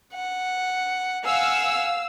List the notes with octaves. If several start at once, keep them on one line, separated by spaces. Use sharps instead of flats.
F#5
F5 F#5 G#5 E6